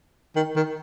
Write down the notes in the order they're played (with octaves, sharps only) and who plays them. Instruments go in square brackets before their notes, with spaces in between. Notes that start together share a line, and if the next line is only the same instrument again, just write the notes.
[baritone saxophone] D#3
D#3